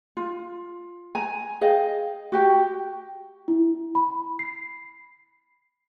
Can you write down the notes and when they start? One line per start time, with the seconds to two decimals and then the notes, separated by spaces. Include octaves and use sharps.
0.17 F4
1.15 G#5 A#5
1.61 G#4 D#5 F5 G5
2.32 F#4 G4 G5
3.48 E4
3.95 B5
4.39 C7